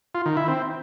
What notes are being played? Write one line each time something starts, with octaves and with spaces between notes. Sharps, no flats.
F4
D#3
E4
C4